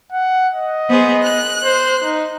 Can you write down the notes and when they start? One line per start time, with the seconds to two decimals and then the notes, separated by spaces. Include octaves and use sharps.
0.12 F#5
0.54 D#5
0.89 B3 G#4 C5
1.22 F#6
1.64 C5
2.03 D#4